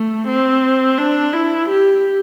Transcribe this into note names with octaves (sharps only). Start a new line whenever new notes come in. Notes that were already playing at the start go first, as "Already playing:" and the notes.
Already playing: A3
C4
D4
E4
G4